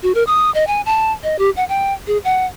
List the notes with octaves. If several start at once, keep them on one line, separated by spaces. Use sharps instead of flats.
F#4
A#4
D#6
D#5
G#5
A5
D#5
G4
F#5
G5
G#4
F#5